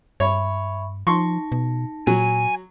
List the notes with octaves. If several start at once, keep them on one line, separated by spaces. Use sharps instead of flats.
G2 C#5 E5 B5 C#6
F3 D#4 A5 C6 C#6 A#6
B2
A#2 F#3 G#5